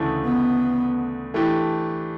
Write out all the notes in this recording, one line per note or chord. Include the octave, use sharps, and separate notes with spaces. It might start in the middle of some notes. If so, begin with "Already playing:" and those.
Already playing: D2 C#3 E3 A3 D4
B3
E3 A3 D4 G4